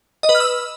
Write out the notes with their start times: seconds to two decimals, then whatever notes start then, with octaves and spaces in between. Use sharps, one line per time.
0.23 D#5
0.29 B4
0.35 F6
0.40 E6